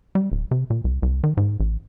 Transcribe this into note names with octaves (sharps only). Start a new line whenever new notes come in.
G3
D1
C3
A#2
C2
C2
D#3
G#2
A1